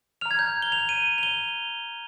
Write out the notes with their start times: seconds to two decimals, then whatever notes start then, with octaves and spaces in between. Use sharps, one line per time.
0.21 A#5 F6 F7
0.31 G#6
0.39 G6
0.62 G7
0.72 F7
0.89 D#7
1.18 F7
1.23 G7